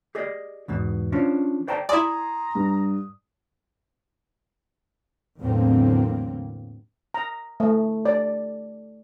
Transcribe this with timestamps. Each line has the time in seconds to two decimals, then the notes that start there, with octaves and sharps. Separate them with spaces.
0.15 G4 G#4 D5 D#5
0.68 E2 G#2 B2
1.12 F3 C#4 D4
1.68 C5 D5 G5 A5 A#5
1.89 E4 D5 G#5 A#5 C6 D#6
2.55 G2
5.40 E2 A2 D3 F#3 A#3 C4
7.14 A#5
7.60 A3
8.05 D5